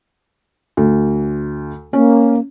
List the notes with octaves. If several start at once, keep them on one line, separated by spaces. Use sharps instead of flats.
D2
A#3 C#4